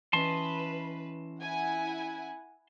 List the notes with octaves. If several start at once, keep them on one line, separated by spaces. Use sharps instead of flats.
E3 C#4 B4 D#5 A5 C6
E4 F#5 G#5